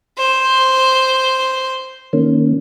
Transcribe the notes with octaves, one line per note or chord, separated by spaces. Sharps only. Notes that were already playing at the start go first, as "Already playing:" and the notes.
C5
D#3 A#3 C#4